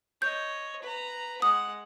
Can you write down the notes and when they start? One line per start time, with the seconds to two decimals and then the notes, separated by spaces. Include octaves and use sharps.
0.22 C#5 D#5 G6
0.83 B4 A#5
1.42 G#3 F#5 D#6